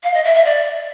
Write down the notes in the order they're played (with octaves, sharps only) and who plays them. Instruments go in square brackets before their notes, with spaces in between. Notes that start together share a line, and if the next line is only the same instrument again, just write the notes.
[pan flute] F5
D#5
E5
E5
D5